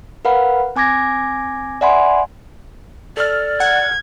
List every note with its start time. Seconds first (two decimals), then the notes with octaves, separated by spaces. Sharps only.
0.25 A#4 B4 F5 F#5 B5
0.76 C4 G#5 D6 G#6 A#6
1.81 D5 E5 F#5 G#5 B5 C6
3.17 A4 D5 E6 F6
3.60 F#5 G#6